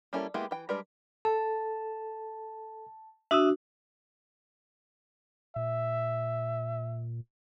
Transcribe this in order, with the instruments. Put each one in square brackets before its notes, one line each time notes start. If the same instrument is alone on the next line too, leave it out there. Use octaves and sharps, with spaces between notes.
[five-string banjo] G3 A#3 C#4 E4 A4
G#3 A#3 B3 E4 G4
E3 G5
G3 G#3 D4 A#4 B4
[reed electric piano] A4 [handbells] A5
[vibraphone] D4 F#4 [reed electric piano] E5 D#6 E6
[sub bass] A#2 [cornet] E5